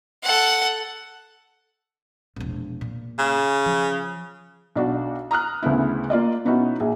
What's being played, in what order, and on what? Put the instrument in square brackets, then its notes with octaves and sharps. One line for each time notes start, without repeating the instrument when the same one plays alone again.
[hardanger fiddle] A4 F#5
[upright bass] E1 A#1
A#2
[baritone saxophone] C#3
[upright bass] F3
[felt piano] B1 D4 F#4
A#5 D#6 F6 F#6
D2 C#3 B3 E4
A#3 F4 D5 D#5
B2 B3 C#4 D#4 E4 F#4
A#1 G#4